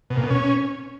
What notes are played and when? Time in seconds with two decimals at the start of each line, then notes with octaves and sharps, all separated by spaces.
0.10 B2
0.17 A#2
0.24 B2
0.30 C#4